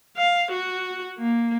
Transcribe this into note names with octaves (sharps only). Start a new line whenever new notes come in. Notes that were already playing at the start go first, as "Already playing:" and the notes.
F5
F#4
A#3